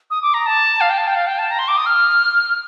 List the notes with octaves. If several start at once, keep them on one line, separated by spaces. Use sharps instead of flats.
D#6
D6
A#5
A5
F5
G5
A5
G5
F5
G5
A5
A#5
C6
D6
D#6
F6